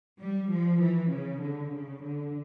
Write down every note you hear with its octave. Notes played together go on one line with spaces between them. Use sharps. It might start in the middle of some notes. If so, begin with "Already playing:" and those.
G3
F3
E3
C#3
D3
C#3
D3